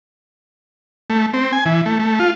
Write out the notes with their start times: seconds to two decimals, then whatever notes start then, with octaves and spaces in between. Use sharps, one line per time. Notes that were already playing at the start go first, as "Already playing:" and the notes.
1.10 A3
1.33 C4
1.53 G#5
1.66 E3
1.86 A3
1.99 A3
2.20 F4